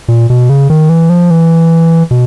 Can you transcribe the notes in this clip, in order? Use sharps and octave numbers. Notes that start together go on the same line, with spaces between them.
A#2
B2
C#3
D#3
E3
F3
E3
B2